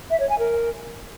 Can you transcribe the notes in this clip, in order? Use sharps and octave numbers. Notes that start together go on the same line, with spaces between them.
E5
C#5
G#5
A#4